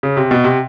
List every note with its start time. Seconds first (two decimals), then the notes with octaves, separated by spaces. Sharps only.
0.03 C#3
0.17 C3
0.31 B2
0.44 C3